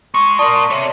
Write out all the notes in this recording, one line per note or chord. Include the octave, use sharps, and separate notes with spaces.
G#3 C#6
F4 A#4 D5 A5 D#6
G4 C#5 E5